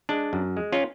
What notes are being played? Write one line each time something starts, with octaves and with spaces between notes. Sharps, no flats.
G#3 D4
F#2
G#3
C#4 F4